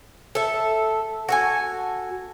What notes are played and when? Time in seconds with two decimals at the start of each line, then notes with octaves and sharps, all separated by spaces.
0.35 A4 E5
1.29 F#4 A4 G#5